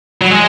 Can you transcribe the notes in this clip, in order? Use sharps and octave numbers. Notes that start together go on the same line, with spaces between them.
F#3
G#3